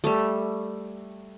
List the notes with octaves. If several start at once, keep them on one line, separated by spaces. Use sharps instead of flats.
G3 A3